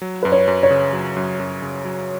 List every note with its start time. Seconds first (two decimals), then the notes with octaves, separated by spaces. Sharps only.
0.02 F#3
0.23 F#2 B4
0.32 C#5
0.48 F#2
0.63 C#5
0.70 C#3
0.93 F#3
1.17 F#2
1.40 F#2
1.62 C#3
1.85 F#3